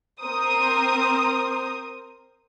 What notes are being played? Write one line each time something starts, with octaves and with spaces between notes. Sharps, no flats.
C4 A#4 C5 D#6